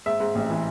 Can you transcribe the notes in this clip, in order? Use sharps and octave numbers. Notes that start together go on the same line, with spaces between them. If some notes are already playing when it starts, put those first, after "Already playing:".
G#2 E5
G#2
A1
E3